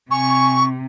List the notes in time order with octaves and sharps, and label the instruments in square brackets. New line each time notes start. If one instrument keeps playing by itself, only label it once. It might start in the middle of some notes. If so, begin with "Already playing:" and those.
[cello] C3 [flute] G#5 [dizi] C#6